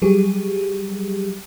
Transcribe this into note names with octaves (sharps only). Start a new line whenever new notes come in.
F#3 G3 G4 G#4